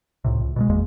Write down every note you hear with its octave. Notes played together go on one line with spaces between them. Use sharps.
C#2 A2 C3
C#2
B2 F3 G#3
G#1 E2 G#3 A#3